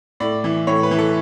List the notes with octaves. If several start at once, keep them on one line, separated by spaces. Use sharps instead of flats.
A2 D5
E3
A2 C#5
B4
E3
A4